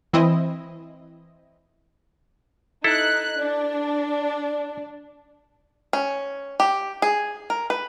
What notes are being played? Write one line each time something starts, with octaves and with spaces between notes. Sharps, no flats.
E3 C4 E4 D#5
D#4 E4 A4 F#6
D4 D5
C#4
G4
G#4
A#4
B4